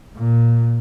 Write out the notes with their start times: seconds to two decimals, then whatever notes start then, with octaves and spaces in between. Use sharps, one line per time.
0.16 A#2